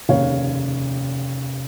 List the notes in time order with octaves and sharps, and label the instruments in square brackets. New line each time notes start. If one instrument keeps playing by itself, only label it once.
[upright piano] F1 D#2 C#3 C#5 F5